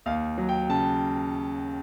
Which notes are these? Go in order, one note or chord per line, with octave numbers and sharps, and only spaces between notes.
D#2 F5
F#3
G5
C#3 A5